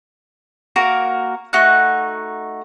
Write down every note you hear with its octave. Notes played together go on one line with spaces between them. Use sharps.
A#3 F#4 A#4
A3 D#4 F#4 F#6